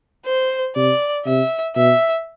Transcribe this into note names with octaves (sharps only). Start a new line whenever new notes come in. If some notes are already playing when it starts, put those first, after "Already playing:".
C5
C3 D5
C3 E5
B2 E5